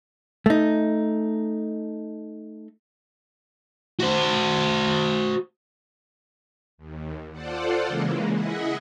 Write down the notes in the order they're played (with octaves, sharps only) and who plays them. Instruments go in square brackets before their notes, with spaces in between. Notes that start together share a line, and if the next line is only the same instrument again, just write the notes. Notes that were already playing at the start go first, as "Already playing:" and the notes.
[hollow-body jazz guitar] A3 D#4
[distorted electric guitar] F#4 C5
[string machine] D#2
F4 A4 C5 D5 F#5
C#3 E3 G#3 A#3
E4 G#4 D#5 E5 F#5